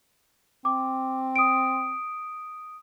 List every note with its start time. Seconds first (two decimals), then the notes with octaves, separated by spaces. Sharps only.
0.65 C4 D6
1.36 D#6 D7